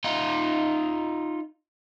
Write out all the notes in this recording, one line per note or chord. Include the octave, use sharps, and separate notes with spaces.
D#4 F4